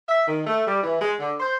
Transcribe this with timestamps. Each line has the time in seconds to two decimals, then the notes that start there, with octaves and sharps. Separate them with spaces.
0.09 E5
0.27 D#3
0.47 A3
0.67 G3
0.83 E3
1.01 G#3
1.19 D3
1.40 C5